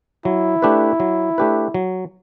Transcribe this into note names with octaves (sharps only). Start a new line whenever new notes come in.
F#3 E4
A3 D4 G4 B4
F#3
A3 D4 G4 B4
F#3